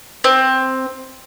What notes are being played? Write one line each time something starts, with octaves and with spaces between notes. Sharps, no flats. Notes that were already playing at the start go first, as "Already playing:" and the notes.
C4